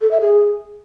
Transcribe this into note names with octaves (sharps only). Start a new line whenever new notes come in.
A4
E5
G#4